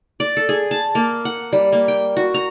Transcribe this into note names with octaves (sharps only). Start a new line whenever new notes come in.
D5
A4
G#4
A5
A#3
F#5
G3
A#3
G5
F#4
A#5